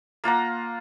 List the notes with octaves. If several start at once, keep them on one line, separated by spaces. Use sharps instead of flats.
A#3 F4 F#5 A#5